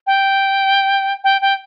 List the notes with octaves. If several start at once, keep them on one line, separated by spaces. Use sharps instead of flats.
G5
G5
G5